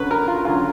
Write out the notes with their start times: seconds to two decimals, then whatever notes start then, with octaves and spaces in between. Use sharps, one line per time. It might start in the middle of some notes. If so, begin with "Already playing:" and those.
Already playing: F#2 D3 F#3 B4
0.11 A#4
0.28 F4
0.45 F#2 D3 F#3 F4